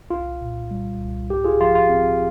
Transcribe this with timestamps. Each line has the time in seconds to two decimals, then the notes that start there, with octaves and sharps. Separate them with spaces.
0.10 C2 F4
0.41 A#2
0.71 G3
1.00 C2
1.30 G#2 G4
1.44 F4 G#4
1.61 F3 F4
1.75 F4
1.89 C4